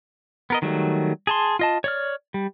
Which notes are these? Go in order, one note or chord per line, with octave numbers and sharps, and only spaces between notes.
B3 A#4 D#5
D#3 F#3 G3 A3
G#4 A5 C6
F4 D#5 A5
C#5 D5 F6
G3